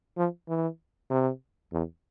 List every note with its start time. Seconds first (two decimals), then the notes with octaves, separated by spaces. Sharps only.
0.17 F3
0.49 E3
1.10 C3
1.73 E2